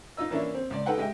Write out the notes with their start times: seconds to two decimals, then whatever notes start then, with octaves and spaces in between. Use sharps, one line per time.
0.17 D#4 F4 D#5 E6
0.30 E3 A#3 C#4 D4 E4
0.55 C4
0.70 C#2 D5
0.86 D#4 A4 B4 F#5 G5
0.98 G#3 G4 D#5 E5 G5